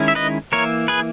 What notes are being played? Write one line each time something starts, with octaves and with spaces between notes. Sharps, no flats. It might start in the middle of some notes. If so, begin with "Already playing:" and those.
Already playing: D#3 G#3 C#4 E4
E5
B4 D#5
E3 A#3 E4 A#4 C#5
G#4 B4